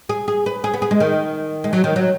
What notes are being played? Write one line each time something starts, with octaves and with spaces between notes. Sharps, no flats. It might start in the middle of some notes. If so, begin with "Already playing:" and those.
G#4
G#4
B4
G#4
B3
G#4
G#3
D#3
G#3
F#3
D#3
F#3